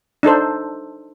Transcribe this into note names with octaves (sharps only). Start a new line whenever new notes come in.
D4 D#4 A4 C5